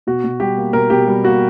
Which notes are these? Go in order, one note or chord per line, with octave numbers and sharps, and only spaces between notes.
B2 F#4
B2
G3 G4
A#3
B2 A#4
B2 G4
G3
A#3 F#4